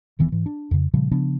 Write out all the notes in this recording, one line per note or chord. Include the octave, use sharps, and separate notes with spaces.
D#1 D#3 E3 B3
G#2 E3
D4
F2 C#3
A#2 C#3 F3 G3
C#3 F3 B3 D4